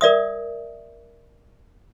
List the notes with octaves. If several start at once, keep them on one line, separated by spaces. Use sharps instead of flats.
A#4 D5 E5 D#6